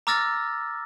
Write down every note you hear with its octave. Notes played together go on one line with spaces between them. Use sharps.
A#5 D6 E6 F6 A6 A#6